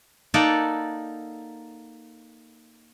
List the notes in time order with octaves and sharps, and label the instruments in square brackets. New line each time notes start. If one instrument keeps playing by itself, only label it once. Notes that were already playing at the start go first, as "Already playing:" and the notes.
[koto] A#3 D#4 A4 D5 F#5 G5